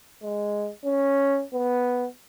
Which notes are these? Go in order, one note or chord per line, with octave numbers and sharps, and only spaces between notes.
G#3
C#4
B3